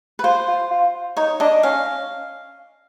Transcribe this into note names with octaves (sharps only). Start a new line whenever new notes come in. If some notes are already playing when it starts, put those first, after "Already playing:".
B4
F4 C5
F4
F4
D#4 C#5
D4 D#5
C#4 F5